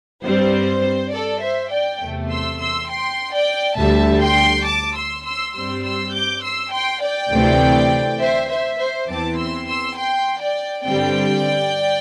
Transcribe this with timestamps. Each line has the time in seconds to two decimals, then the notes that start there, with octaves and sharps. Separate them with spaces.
0.24 G2 G3 C4 C5
1.12 A4 D5
1.42 C5 E5
1.72 D5 G5
2.01 E2 C3 A3
2.30 C6 E6
2.60 C6 E6
2.90 G5 C6
3.33 D5 G5
3.78 D2 D3 G3 E5 A5
4.22 G5 C6
4.67 A5 D6
4.96 C6 E6
5.25 C6 E6
5.55 G2 G3 C4 C6 E6
5.84 C6 E6
6.14 D6 G6
6.43 C6 E6
6.73 G5 C6
7.02 D5 G5
7.31 D2 C3 E3 A3 C4
8.20 C5 E5
8.50 C5 E5
8.79 C5
9.09 E2 E3 C4 A5 D6
9.38 C6 E6
9.67 C6 E6
9.98 G5 C6
10.41 D5 G5
10.85 G2 D3 G3 C4 D5 G5